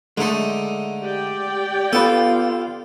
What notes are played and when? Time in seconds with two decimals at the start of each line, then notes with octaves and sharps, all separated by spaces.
0.17 D3 G#3 A3 D#4
1.02 G4 D5 G5
1.93 B3 F4 A4 B4